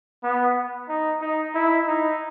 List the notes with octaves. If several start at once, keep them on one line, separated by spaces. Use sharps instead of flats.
B3
D#4
D#4
E4
D#4